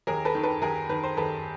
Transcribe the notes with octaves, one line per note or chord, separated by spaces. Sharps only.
D#2 G#4 A#4
A4 B4
D#3
A4 B4
D#2 G#4 A#4
D#3 B4
C5
D#2 A4 B4